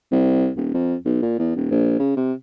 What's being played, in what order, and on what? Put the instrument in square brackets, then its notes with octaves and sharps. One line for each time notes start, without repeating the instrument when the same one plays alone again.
[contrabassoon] C2
D#1
F2
B1
A#2
E2
D#1
A#1
C#3
C3